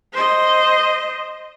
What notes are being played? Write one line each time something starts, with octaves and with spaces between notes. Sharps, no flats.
C5 D#5